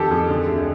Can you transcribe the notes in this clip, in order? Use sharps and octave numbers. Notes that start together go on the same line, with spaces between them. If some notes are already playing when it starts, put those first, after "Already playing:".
Already playing: F2 D#3 G4 A4
F2 G#4
D3
D2